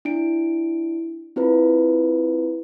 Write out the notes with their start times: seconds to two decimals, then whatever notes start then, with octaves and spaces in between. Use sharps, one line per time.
0.05 D4 E4 D7
1.36 C4 E4 F4 A#4 B4